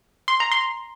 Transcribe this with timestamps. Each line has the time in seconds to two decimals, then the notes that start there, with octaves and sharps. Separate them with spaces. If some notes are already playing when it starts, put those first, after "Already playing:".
0.28 C6
0.40 A#5
0.52 C6